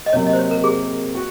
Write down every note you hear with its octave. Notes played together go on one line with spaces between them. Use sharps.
D#5
C3 F#3 A#3 C#5
D#5
C5
C#5
A#4
G#4
F#4